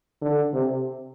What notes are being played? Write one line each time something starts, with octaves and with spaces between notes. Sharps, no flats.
D3
C3